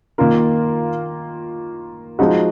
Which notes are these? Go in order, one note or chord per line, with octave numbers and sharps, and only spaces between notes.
D#3 A#3 F4 A#4
F3 G#3 D#4 F#4